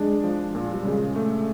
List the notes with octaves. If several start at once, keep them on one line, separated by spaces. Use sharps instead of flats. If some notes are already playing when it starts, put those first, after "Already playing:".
Already playing: G#3 D4
F3
A#2
G3
C#3 G#3
A3